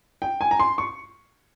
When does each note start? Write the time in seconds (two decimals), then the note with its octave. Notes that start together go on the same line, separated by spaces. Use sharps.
0.22 G5
0.41 G#5
0.51 A#5
0.60 C6
0.78 C#6